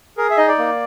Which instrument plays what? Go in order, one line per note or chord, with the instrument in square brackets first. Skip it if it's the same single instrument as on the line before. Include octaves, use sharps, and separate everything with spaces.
[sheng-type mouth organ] G#4 A#4
E5
D#4 D#5
D5
A#3